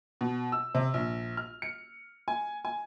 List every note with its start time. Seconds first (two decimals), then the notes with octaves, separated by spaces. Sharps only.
0.21 B2
0.52 E6
0.75 C3
0.94 A#1
1.37 F6
1.62 C#7
2.28 G#5
2.65 G#5